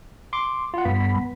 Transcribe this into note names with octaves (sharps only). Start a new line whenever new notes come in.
C6 D6
F4 F#5
G2 B3 B5